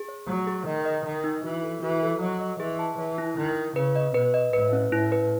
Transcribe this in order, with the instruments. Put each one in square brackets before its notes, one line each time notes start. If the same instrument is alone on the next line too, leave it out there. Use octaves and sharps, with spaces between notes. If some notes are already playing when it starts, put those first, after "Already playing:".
Already playing: [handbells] G#4
C#5
[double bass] F#3 [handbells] A3
[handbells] G#4
[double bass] D#3 [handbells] D#5
[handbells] D#5
[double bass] D#3 [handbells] D#5
[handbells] D#4
[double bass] E3 [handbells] F#4
[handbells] A4
[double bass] E3 [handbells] F#4
[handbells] A4
[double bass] F#3 [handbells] D#5
[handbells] D#5
[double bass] E3 [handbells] G#4
[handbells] A5
[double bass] E3 [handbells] C#5
[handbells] E4
[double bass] D#3 [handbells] E4
[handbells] E4
[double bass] C#3 [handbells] B4
[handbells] D#5
[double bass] B2 [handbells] B4
[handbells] D#5
[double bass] A2 [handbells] B4
[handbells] C#4
[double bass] A2 [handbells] E4
[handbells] B4